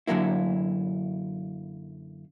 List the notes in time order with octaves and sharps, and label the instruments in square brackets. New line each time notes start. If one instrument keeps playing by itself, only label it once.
[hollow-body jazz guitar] F#2 D3 F#3 A#3 E4